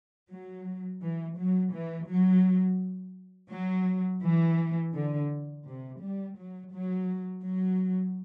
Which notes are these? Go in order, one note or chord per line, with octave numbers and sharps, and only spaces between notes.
F#3
E3
F#3
E3
F#3
F#3
E3
D3
C3
G3
F#3
F#3
F#3